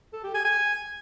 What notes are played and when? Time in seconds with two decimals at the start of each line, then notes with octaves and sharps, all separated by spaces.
0.13 A4
0.24 G4
0.34 G#5
0.45 G#5